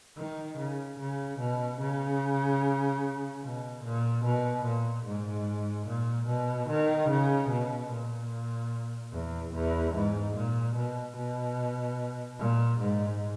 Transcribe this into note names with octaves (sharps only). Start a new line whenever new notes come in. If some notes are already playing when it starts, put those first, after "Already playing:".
D#3
C#3
C#3
B2
C#3
B2
A#2
B2
A#2
G#2
A#2
B2
D#3
C#3
B2
A#2
E2
E2
G#2
A#2
B2
B2
A#2
G#2